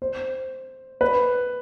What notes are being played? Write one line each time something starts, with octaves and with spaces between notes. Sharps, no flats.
C5
B4